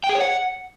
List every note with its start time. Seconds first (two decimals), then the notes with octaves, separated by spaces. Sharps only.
0.04 G5
0.09 G#4
0.15 C#5
0.20 F#5